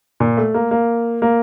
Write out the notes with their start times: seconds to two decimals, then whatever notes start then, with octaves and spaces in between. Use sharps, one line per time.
0.20 A#2
0.37 A3
0.54 A#3
0.71 A#3
1.22 A#3